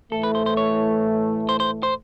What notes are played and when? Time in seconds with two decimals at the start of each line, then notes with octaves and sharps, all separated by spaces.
0.12 A2 E3 A3 A4
0.23 B4
0.35 C5
0.46 C5
0.57 C#5
1.49 C5
1.60 C5
1.83 C5